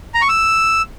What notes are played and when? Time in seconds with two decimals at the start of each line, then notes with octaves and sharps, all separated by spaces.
0.14 A#5
0.22 C#6
0.29 E6